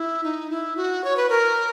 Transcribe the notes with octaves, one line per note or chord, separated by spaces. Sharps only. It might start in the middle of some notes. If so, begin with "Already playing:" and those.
Already playing: E4
D#4
E4
F#4
C#5
B4
A#4